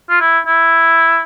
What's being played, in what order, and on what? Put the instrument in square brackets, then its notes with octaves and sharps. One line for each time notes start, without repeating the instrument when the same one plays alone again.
[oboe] F4
E4
E4